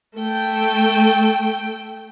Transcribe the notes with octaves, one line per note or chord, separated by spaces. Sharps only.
A3 G5